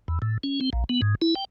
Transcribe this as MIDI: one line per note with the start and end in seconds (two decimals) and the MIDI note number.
0.08 0.19 40
0.22 0.38 45
0.44 0.60 61
0.61 0.70 60
0.73 0.84 34
0.89 1.01 59
1.02 1.15 44
1.22 1.35 64
1.36 1.45 79